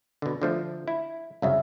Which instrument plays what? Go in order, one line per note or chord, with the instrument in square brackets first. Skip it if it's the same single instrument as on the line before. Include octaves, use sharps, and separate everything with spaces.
[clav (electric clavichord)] B2 D3
D3 F3 A3
E4
[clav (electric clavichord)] C2 F#2 C#3 [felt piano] E5